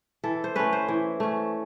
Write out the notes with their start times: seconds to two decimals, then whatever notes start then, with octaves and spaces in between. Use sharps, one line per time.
0.24 E3 A4
0.44 C5
0.56 A3 C#4 B4
0.73 C5
0.88 E3
1.20 A3 C#4